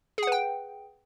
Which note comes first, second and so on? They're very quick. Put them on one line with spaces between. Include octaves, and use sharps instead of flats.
G#4 F#5 B4 G5